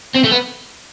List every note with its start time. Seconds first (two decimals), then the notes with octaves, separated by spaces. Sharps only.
0.15 C4
0.25 A3
0.32 B3